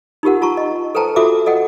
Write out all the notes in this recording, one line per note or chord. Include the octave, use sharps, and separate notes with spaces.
D#4 F4 G4 A#4 F#5
F4 A5 A#5 C#6
D#5
A4 B4 C5 G5 A5 A#5
F4 F#4 A4 E5 D6
A4 D#5 F#5 G5